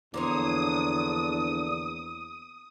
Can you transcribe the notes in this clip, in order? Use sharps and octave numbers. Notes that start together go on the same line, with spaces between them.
E2 D3 F3 A#3 D4 C5 C#5 D#6